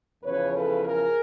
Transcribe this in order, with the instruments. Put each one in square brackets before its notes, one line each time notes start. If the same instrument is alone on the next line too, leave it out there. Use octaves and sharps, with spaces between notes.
[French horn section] E2 C#3 F3 B4 C#5
A4 B4
G#4 A#4